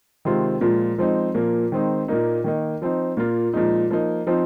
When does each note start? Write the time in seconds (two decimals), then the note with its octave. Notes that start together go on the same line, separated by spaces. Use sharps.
0.25 C3 D#3 G#3 C4 F4
0.61 A#2 F3 G#3 F4
0.98 F3 G#3 C4 D#4
1.34 A#2 F3 A#3
1.72 D#3 G#3 C4 D#4
2.08 A#2 A#3 D#4
2.44 D#3 A#3 D#4
2.82 F3 C4 D#4
3.17 A#2 A#3 F4
3.53 A#2 F3 G#3 D#4
3.90 F3 A#3 D#4
4.27 F3 C4 D#4